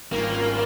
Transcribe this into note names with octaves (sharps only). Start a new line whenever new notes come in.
G#1 G#2 G3 A#3 C#4 F4